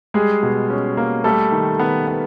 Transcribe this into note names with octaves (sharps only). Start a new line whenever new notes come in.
G3 G#3 G#4
B2
C#4
A#3
G3 A3 A4
D#3
D#3 B3 B4
B3